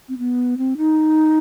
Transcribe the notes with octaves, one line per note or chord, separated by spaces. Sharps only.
C4
B3
C4
D#4